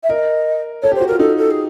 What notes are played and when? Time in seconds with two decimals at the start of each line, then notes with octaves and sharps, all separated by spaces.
0.03 E5
0.09 A#4 D#5
0.82 A4 C#5
0.92 G4
0.95 C5
1.01 F#4
1.07 F4 A#4
1.19 D#4 A4
1.38 A4
1.50 G#4